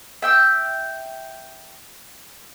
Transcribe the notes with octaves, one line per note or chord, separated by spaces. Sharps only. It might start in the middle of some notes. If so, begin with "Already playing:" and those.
E5 G5 E6